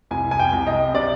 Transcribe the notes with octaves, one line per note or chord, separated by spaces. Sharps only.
C2 G#5
G#5
G5
C2
D#5
C3 D5